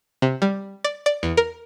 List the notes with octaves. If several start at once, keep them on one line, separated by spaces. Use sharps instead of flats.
C3
G3
D5
D5
E2
A#4